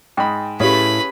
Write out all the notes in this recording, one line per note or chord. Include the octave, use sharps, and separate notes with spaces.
G#2 D#5 G5 B5
A2 C#4 G4 G#4 B4 F5 B5